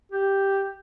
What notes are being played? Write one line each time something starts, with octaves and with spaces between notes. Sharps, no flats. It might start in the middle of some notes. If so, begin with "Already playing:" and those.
G4